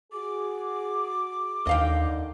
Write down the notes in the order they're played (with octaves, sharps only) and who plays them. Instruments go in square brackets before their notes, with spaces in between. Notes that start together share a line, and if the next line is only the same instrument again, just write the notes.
[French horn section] F#4 G#4 [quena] D6
[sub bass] D#2 [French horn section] D3 D#3 [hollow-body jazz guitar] D#5 F5 G5